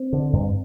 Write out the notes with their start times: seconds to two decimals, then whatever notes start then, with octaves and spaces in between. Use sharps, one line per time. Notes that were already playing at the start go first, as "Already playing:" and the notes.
Already playing: C4
0.13 D3
0.33 G2